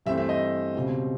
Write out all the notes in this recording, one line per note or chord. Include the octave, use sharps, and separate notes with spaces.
G2 E3 A3 C4 E5
E5
D#5
C#2 B2 G3 C4